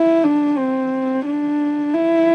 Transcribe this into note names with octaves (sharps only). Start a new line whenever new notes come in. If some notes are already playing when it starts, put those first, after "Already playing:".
Already playing: E4
D4
C4
D4
E4